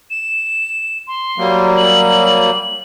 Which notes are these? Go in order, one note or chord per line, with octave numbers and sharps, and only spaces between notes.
E7
C6
F#3 G3 A#3
F#7